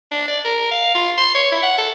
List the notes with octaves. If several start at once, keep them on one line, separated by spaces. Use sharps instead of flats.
D4
D5
A#4
F5
F4
C6
C#5
E4
F#5
A4